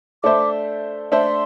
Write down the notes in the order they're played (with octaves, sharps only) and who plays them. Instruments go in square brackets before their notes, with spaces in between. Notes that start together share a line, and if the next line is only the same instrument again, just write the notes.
[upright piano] A3 D4 A4 C5 E5 [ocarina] D6
[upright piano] A3 D4 A4 C5 E5 [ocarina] C6